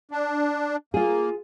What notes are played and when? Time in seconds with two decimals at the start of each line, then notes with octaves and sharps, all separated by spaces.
0.11 D4
0.94 A#3 F4 G#4